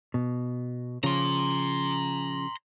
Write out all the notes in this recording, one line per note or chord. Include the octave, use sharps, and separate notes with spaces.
B2
C#3 F3 A#5 C6